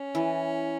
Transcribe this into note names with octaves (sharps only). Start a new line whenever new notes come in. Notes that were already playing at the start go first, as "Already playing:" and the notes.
Already playing: C#4
E3